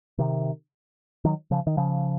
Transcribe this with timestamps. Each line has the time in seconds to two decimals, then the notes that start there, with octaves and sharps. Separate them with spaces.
0.18 C3 D#3
1.25 D#3 F#3
1.51 C#3 F3
1.67 D#3
1.77 C#3 F3